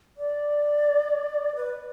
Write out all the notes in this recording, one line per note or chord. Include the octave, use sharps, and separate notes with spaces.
D5
B4